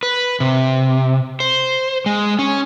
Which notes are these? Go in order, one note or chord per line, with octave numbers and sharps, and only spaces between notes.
B4
C3
C5
G#3
C#4